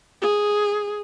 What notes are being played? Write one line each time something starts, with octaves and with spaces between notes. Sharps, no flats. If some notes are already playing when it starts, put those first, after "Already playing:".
G#4